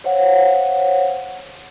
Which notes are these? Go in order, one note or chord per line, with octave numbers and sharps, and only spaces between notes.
C5 C#5 F5 F#5